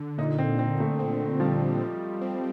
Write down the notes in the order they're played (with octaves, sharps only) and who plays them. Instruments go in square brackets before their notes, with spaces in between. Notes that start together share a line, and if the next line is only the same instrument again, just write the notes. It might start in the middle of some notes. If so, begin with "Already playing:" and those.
Already playing: [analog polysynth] D3
[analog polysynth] A#2 [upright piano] D#4
[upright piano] C4
[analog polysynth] A#2 [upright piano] C4
[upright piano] A3
[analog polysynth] C4
[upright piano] F3 [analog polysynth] G3
[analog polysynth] G3
C4